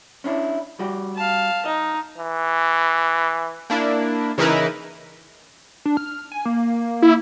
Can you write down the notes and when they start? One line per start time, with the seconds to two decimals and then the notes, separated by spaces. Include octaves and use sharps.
0.24 C#4 D4 E4
0.79 G3 F#4 G4
1.16 F5 A5
1.66 D#4 D#5
2.18 E3
3.70 A#3 D4 E4
4.38 C#3 E3 D#4 E4 A#4 B4
5.85 D4
5.97 F6
6.32 G#5
6.46 A#3
7.02 E4